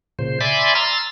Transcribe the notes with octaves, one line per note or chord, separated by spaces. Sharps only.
A#2 C#3 C5
D5 E5 G#5 B5 C6 D6
A#5 C6 E6 F6 A6